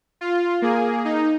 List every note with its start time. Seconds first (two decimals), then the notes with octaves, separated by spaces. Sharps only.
0.21 F4
0.62 A#3 G#4
1.05 D#4